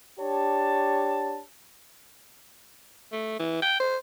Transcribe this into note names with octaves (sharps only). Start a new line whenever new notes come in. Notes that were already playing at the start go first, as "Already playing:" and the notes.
D4 G4 C#5 A5
A3
E3
G5
C5